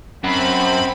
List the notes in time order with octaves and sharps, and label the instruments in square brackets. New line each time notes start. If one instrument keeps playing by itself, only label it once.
[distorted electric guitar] F#2 [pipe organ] C4 B5